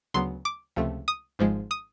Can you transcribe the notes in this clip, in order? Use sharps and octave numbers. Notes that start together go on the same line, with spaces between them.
D2 C#3 F#3 B3 C6
D6
C#2 C3 F3 A3
D#6
G#1 G#2 F3 G#3
D#6